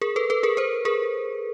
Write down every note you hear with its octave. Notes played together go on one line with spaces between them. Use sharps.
G#4 A#4
A4 B4
A4 B4
G#4 A#4
A#4 C5
G#4 A#4